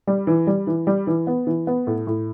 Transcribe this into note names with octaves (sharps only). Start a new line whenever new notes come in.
G3
E3
G3
E3
G3
E3
B3
E3
B3
A2
A2